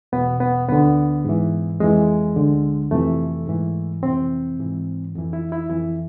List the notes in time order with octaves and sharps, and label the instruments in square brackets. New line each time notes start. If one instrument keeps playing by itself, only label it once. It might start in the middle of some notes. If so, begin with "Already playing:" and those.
[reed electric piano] E2 B2 B3
B3
D2 D3 B3
G#2 E3
F2 E3 G#3
D2 D3
F2 C3 E3 A3
G#2 E3
F2 C3 E3 C4
G#2 E3
F2 E3
E4
E4
F2 E3 E4